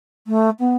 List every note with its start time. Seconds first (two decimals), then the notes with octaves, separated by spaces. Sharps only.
0.27 A3
0.60 B3